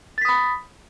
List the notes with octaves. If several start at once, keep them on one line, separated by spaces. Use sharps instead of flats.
B5 D#6 A6 B6